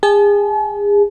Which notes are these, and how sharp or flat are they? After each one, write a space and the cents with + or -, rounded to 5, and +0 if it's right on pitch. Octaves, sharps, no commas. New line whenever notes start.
G#4 -30 A5 -45